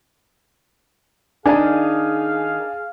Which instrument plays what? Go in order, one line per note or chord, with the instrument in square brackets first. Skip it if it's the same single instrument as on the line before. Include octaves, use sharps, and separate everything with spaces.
[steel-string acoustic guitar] D#3 D#4 [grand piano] D4 [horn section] G#4 F5 [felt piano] G#5